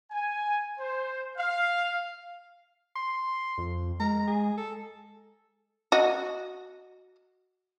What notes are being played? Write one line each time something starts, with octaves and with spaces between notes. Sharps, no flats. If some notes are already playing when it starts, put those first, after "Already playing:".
G#5
C5
F5
C6
F2
G#3 A#5
G#4
A4
F#4 D#5